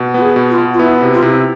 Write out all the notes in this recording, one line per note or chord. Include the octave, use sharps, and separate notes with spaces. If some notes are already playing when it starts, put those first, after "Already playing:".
Already playing: B2
B3 F4
G#4
B2
F4
B2
F4
B3 E4
C3
F4
C3 E4